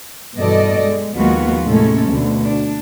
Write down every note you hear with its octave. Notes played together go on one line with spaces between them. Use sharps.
G2 B2 E3 A4 D5 D#5
G#3
D#2 F3 G#3 B3 F4 F#4
A2 C3 G#3 A#3 C#4 A4
D2 B2 D3
D4